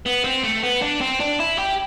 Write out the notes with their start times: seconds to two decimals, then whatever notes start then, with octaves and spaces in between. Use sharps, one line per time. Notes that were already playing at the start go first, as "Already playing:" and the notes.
0.06 B3
0.24 C4
0.44 A3
0.63 B3
0.82 D4
1.01 C4
1.20 D4
1.40 E4
1.58 G4